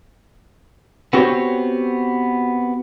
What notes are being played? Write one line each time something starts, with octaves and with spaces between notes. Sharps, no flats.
B3 C4 F#4 G4 C5 C#5